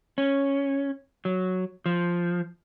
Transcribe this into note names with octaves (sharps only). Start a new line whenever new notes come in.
C#4
F#3
F3